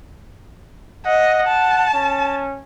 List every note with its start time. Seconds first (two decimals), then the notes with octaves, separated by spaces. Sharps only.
1.06 D#5 F#5
1.48 A5
1.94 C#4